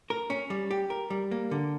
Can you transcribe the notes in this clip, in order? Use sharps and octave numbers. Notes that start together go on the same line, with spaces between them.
A#4
C#4
G3
G4
A#4
G3
A#3
D3